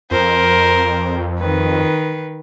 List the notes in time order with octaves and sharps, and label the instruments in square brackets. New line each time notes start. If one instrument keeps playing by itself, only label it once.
[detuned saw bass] F2 [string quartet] A#4 C5
[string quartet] D#3 B4